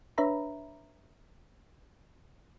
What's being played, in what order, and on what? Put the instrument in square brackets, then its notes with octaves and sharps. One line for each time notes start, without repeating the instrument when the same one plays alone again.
[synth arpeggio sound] D4 B4 C#5 E5 A#5 B5